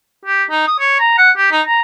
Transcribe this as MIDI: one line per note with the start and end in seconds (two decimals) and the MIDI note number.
0.25 0.43 67
0.50 0.64 63
0.67 0.77 87
0.79 0.98 73
0.99 1.17 82
1.18 1.31 78
1.37 1.50 67
1.51 1.62 63
1.67 1.82 82